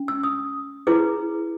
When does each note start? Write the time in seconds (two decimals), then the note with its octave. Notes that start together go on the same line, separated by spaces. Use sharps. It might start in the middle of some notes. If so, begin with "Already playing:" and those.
Already playing: C#4
0.08 E6
0.23 D#6
0.87 E4 G#4 B4 D6